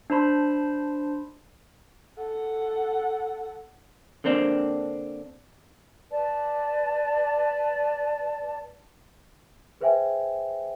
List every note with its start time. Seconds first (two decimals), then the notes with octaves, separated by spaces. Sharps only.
0.10 D4 C5 A5 B5 C6
2.19 A4 F#5
4.24 D3 A#3 C4 D4
6.12 B4 D5 A5
9.81 G#4 B4 C5 E5 G5 G#5